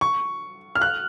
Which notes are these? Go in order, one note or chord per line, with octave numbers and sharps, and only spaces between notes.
C#6
F6
F#6